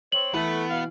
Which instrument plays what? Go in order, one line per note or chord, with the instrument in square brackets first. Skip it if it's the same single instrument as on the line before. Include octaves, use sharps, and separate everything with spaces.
[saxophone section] C4 C#5 [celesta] F#7
[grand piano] E3 [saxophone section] A3 [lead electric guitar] B3
[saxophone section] B2 F5